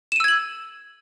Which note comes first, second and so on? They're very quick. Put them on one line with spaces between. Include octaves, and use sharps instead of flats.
E7 D#7 E6 G#6 F#7